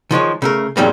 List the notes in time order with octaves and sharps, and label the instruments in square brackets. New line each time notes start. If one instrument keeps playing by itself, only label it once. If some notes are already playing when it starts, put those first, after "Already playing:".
[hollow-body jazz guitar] D#3 F3 G#3 C#5
C#3 A3 A#4
F2 G#2 D#3 F#3 G3 A#3